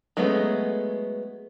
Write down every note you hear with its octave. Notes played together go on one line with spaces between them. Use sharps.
F#3 G#3 A3 B3 C#4